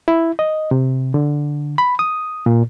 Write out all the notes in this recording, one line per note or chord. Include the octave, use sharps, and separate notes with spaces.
E4
D#5
C3
D3
B5
D#6
A#2